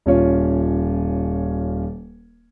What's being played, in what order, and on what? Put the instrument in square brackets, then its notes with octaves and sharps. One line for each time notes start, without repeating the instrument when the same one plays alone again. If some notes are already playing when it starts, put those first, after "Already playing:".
[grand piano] D#1 C#4 F4 C#5